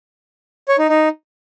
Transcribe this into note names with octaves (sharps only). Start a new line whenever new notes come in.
C#5
D#4
D#4